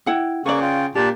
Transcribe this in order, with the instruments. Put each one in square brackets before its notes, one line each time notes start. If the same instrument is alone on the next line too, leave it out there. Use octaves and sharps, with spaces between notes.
[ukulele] E4 F#5 G5
[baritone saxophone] C#3 [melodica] A#3 C#6 [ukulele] B4 D5
[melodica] F4 G5
[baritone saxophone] A#2 [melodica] D4 D5 A5 [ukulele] G4